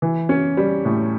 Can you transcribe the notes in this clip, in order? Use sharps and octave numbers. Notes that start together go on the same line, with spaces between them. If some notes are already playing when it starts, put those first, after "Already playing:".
E3
C#4
G3
A2